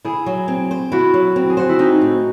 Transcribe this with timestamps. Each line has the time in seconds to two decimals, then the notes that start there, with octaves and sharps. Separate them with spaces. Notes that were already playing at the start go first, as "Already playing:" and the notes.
0.05 E4 G#4
0.26 F#3
0.48 C4
0.71 C5
0.92 E4 F#4
1.14 F#3
1.36 C4
1.50 G#4
1.57 F#4 C5
1.69 E4
1.79 C4 D#4
2.01 A2